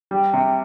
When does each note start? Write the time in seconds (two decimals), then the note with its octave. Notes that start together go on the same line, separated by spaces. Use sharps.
0.11 G3
0.34 C3